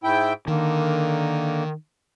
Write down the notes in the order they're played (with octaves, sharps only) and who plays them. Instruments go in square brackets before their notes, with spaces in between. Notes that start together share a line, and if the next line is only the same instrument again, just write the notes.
[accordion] G#2 E4 G5
[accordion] D3 A#3 [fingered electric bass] D#3